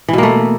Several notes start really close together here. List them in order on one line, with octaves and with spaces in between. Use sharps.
E3 B2 A#3 A3